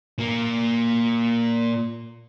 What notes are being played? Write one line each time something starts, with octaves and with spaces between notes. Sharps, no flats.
A#2 A#3